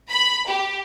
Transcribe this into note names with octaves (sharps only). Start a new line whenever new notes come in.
B5
G4